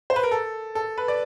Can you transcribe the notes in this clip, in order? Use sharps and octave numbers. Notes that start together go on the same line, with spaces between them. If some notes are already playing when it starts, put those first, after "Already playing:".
C5
B4
A#4
A4
A4
B4
D5